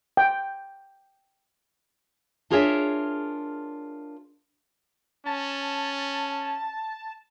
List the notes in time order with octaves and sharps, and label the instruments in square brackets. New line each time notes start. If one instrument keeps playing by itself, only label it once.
[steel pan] G5
[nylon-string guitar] D4 F4 G#4 A#4 C#5 E5
[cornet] C#4 [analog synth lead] A5